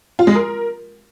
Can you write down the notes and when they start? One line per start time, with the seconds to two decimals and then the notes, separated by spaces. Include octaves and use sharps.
0.19 F4
0.27 G#3
0.35 A#4